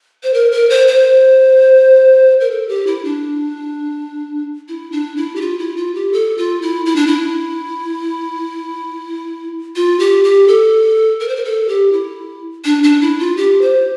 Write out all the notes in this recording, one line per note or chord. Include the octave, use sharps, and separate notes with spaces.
C5
A#4
A#4
C5
C5
A#4
A4
G4
E4
D4
E4
D4
E4
G4
F4
E4
F4
G4
A4
F4
E4
E4
D4
E4
F4
G4
G4
A4
A#4
C5
A#4
A4
G4
E4
D4
D4
E4
F4
G4
C5